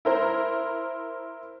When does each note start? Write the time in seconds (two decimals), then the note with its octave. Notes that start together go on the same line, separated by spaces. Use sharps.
0.05 E4 A#4 C5